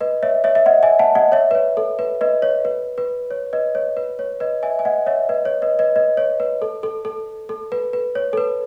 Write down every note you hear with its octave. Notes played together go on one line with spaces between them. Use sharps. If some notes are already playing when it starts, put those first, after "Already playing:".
B4 D#5
C#5 E5
C#5 E5
E5
D#5 F#5
E5 G#5
F#5 A5
D#5 F#5
C#5 E5
B4
C#5
A4
B4
B4 D#5
C#5
B4
B4
C#5
B4 D#5
C#5
B4
C#5
B4 D#5
E5 G#5
G#5
D#5 F#5
C#5 E5
B4 D#5
C#5
B4 D#5
B4 D#5
B4 D#5
C#5
B4
A4
A4
A4
A4
B4
B4
C#5
A4
B4